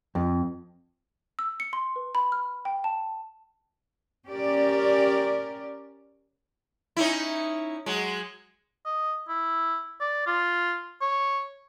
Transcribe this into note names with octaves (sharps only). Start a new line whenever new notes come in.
F2
E6
C#7
C6
B4
B5
F6
G5
A5
C#4 G4 A#4 D5
C#4 D#4 E4
F#3 G#3
D#5
E4
D5
F4
C#5